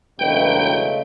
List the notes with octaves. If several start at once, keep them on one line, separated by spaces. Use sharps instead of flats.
E1 D#2 C#3 F#3 G#3 A3 B4 G5